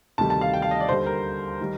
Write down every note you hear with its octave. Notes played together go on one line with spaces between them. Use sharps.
D2 C3 D#3 G3 A5
A5
F5
G5
F5
D#5
D5
D#2 D3 G3 C5
A#4
D#3 G3